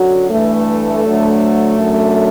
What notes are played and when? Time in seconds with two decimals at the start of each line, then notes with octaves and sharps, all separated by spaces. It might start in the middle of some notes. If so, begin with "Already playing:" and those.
Already playing: F#2 D3 F#3 F#4
0.30 G2 E3 A3
1.04 D2 D3 F#3
1.78 F#2 D3 F#3